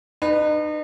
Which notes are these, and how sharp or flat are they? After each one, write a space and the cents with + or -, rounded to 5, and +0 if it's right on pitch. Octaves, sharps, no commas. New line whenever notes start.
D#4 -40 B4 +0